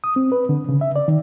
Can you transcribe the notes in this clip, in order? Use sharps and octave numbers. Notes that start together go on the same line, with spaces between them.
D#6
C4
B4
D3
C#3
E5
D5
D#3